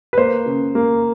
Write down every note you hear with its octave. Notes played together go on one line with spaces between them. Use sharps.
B4
A#3 C5
C#3
A#3